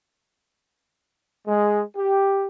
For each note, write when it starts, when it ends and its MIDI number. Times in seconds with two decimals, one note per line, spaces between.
1.47 1.80 56
1.97 2.46 67